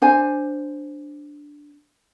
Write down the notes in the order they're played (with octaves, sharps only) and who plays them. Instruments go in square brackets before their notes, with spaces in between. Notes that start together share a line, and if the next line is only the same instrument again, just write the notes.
[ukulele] D4 C5 G#5